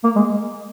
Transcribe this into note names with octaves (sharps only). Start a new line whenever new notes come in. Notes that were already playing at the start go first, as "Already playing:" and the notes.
A#3
G#3